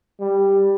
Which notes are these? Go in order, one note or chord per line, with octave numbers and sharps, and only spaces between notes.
G3